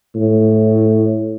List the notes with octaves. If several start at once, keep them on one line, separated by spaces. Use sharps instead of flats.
A2